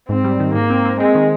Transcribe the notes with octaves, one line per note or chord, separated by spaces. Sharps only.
G#2 C4
G3
D#3
G#2 A#3
C4
C4
G#3 C4
D#3